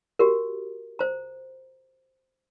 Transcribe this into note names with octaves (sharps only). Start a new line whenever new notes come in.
F#4 G4 A#4
C5 A#5